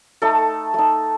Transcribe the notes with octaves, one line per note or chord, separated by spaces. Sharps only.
A3 D#4 A4
A3 D#4